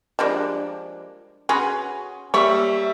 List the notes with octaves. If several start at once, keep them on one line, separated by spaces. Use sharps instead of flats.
F3 G3 G#3 A#3 D4
C#4 F#4 G#4 B4 C6
G3 A#3 C#5 E5 B5 C#6